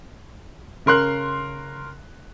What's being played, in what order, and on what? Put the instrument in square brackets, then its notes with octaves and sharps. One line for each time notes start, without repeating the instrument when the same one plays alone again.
[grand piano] C#3 A#4 C6 F#6